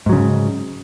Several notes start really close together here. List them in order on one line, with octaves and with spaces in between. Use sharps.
G#2 F#3 C#3